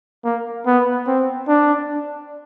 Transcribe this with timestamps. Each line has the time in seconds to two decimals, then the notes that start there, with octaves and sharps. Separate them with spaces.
0.25 A#3
0.66 B3
1.07 C4
1.48 D4